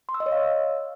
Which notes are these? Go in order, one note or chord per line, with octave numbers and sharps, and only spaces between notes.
C6
E6
D#5
C#5
F5